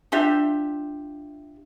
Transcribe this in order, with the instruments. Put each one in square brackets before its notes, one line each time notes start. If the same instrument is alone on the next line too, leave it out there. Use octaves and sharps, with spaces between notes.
[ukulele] D4 F4 G4 E5